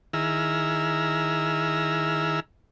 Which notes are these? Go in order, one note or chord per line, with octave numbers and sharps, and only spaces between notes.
D#3 E4 G#4 A#5 E6 F6